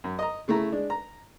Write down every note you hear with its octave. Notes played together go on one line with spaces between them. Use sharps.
F#2
D#5 A#5
C#3 A3 E4 A#5
G#3 D4
A#5